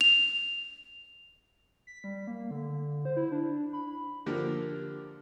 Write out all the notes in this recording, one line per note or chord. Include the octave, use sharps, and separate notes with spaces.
F7
B6
G3
A#3
D3
C5
E4
D4
B5
D3 F3 A#3 G4 A#4